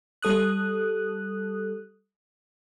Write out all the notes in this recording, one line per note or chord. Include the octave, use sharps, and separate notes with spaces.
G3 A4 D#6 F#6